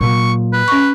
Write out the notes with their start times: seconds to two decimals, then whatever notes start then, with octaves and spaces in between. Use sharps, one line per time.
0.01 A#2 F#3 C#6
0.53 B4
0.68 C#4 C#6